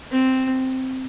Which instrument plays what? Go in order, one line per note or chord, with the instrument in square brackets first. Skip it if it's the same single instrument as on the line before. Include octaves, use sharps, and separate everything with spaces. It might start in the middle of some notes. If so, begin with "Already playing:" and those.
[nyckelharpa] C4